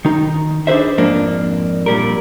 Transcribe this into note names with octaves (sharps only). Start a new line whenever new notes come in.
D#3 D#4
D4 G#4 B4 C5 E5
F2 G#2 A#3 D4
A#2 G3 A#4